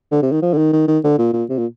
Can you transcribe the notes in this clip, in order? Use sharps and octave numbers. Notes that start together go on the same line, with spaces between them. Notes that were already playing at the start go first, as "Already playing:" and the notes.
D3
C3
D#3
F3
D3
D#3
D#3
D#3
D3
A#2
A#2
C3
A#2